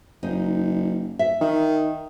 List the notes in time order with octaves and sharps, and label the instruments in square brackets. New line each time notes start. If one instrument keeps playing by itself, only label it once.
[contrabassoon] F#1 [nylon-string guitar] D#4
[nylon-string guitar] E5
[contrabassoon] D#3